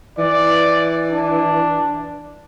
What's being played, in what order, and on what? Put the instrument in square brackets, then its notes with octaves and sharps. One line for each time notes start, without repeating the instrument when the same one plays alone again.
[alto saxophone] E3 [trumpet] D5
[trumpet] D4